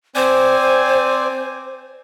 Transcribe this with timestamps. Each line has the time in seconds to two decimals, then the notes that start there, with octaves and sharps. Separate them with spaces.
0.15 C4 C5 D5 G#5